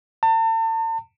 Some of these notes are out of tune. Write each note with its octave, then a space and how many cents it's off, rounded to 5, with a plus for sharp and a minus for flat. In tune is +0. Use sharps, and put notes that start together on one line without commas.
A5 +40